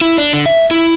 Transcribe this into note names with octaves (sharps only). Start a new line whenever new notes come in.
E4
D4
D3
E5
E4